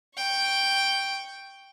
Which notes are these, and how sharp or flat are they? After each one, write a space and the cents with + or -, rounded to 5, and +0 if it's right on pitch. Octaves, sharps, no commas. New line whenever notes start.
G5 +0 C#6 +0